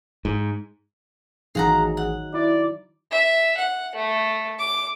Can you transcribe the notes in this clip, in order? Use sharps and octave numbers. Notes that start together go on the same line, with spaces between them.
G#2
A1 D#3 F#3 D#4 G#4 F5 F#5 A#5
F#5
E4 D5
E5
F#5
A3
D6